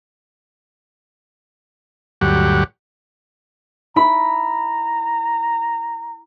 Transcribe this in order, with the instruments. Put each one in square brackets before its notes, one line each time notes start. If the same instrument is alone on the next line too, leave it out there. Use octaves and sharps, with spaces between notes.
[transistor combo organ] D2 G2 F#3 G4 F#5
[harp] E4 B5 [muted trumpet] A#5